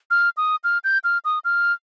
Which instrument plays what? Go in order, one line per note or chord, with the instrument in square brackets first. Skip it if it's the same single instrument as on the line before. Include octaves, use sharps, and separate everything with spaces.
[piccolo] F6
D#6
F6
G6
F6
D#6
F6